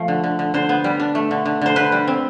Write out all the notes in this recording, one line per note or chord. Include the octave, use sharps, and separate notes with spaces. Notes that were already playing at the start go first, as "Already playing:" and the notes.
Already playing: F3 A3
D3
D3
D3
D3 C5
B3
G3
D4
A3
D3
D3
D3 C5
D3 B4
G3
C4